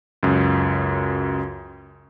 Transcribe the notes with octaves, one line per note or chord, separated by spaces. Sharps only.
C#2 F#2